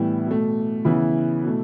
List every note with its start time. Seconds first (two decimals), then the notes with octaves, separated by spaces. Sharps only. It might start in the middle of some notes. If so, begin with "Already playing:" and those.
Already playing: A2 E3 G3 B3 E4
0.26 B2 A3
0.85 C#3 E3 B3 E4
1.44 B2 A3